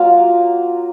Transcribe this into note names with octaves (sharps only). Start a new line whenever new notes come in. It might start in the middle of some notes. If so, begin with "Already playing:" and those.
Already playing: F#3 A#3 F4 F5